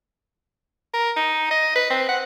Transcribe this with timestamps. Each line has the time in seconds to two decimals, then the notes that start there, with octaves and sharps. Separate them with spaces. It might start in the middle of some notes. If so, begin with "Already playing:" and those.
0.94 A#4
1.16 D#4
1.51 D#5
1.76 B4
1.90 C4
2.09 F#5